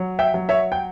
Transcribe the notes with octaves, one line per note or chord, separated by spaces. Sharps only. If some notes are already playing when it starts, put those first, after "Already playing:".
Already playing: F#3
E5 G5
F#3
C#5 E5
G5